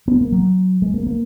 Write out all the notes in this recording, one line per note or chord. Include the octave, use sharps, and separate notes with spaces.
B3
A#3
F#3
G#3
A#3
A#3